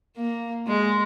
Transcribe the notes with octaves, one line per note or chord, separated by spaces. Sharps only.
A#3
G#3